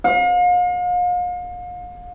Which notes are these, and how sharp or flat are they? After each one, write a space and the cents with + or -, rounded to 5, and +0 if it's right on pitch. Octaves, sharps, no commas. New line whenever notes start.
F5 +40